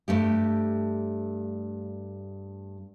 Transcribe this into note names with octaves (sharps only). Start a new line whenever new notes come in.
G2 A3 G4